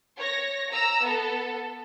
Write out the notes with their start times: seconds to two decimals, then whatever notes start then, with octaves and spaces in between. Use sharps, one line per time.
0.19 C#5 A#6
0.71 A#5 E6
1.02 B3 A4